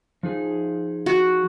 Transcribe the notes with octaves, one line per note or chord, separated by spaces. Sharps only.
F3 D#4 G#4
F#4